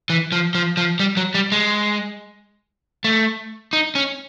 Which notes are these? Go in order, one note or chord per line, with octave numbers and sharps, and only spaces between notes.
E3
F3
F3
F3
G3
F#3
G3
G#3
A3
D#4
C#4